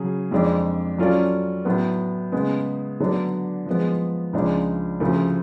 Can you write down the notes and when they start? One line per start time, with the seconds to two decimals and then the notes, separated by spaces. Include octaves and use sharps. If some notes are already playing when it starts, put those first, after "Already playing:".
Already playing: C#3 F#3 C#4 G#4
0.31 F2 F3 G#3 D4
0.98 F#3 C#4 F4 A4 D5
1.65 A2 F#3 B3
2.32 C#3 G#3 B3
3.00 D3 F#3 B3 D4
3.66 F3 G#3 B3
4.33 C#2 C#3 F3 G#3 D4
5.00 D2 C#3 F3 A3